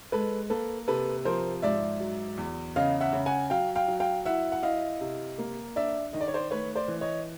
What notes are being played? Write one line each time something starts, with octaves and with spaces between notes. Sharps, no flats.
G#3 A4 B4
A#3 A4 B4
C3 A4 B4
F3 A#4 C5
G#2 D5 E5
F#3
E2
C#3 D#5 F5
E5 F#5
C#3
F#5 G#5
F#3 F5 G5
F5 G5
F#3
F5 G5
E4 E5 F#5
F#5
E4 D#5 F5
C3
A#3
D4 D5 E5
D#3 D#5
D5
C#5
C5 D5
A3 B4 C#5
C5 D5
E3
C#5 D#5